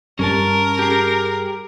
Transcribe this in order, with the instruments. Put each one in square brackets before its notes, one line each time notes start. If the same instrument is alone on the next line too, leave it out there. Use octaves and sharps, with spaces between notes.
[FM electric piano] G2 G3 [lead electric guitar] C#4 A5 [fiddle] A#4
[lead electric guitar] G4 G#4